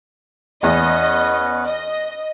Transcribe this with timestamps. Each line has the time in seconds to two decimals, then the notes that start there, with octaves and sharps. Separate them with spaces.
0.63 E2 B3 C#4 B4 D#5
1.66 D#5